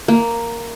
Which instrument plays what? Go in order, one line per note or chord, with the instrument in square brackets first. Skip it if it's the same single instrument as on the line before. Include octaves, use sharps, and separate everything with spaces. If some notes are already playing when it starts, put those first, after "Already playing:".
[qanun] A#3